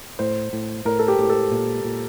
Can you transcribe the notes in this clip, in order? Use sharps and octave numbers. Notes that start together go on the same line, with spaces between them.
A2 C5
A2
A2 A#4
A4
G4
A2 G4
A4
A#2
A#2